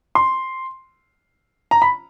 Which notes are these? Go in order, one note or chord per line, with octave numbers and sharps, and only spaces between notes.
C6
A#5
B5